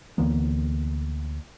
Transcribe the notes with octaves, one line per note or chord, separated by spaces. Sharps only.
D2 E3 A#3 B3